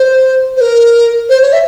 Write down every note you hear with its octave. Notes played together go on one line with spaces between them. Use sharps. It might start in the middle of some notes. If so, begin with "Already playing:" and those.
Already playing: C5
C5
A#4
C5
C#5
E5